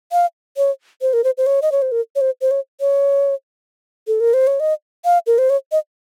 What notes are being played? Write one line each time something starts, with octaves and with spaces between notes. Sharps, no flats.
F5
C#5
C5
A#4
C5
C5
C#5
D#5
C#5
C5
A#4
C#5
C5
C5
C#5
C#5
A4
A#4
C5
C#5
D#5
F5
A#4
C5
C#5
D#5